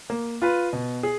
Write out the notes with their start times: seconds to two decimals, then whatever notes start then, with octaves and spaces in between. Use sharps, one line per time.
0.10 A#3
0.42 F4 B4
0.73 B2
1.03 G#4